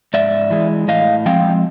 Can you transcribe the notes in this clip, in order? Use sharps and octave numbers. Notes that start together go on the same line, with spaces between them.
G#2 D5 E5
E3 G#3
A2 D#5 F5
F3 G#3 C4 F5 G5